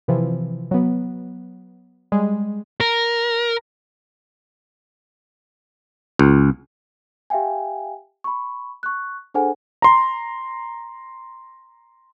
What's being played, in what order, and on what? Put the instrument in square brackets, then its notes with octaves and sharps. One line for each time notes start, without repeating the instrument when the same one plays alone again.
[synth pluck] C3 E3 F3
F#3 B3
G3 G#3
[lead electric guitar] A#4
[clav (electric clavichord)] C#2
[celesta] G4 E5 F5 G5 G#5
B5 C#6
C#6 F#6
D4 G#4 A4 C5 F#5 G#5
[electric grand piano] A#5 C6